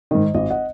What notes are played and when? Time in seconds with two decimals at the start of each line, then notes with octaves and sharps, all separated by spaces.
0.11 G#2 D#3 D#5
0.35 G#1 D#5
0.50 D#5 F#5